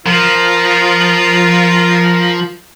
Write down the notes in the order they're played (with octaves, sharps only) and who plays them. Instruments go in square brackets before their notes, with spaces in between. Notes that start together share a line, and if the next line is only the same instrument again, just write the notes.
[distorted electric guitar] F3 [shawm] F4 [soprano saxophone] A#4